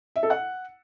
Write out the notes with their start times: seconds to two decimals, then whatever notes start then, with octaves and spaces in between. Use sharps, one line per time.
0.16 E5
0.23 A4
0.30 F#5